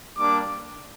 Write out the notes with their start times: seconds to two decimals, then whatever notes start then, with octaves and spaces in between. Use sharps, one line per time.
0.17 G3 A#3 D4 D6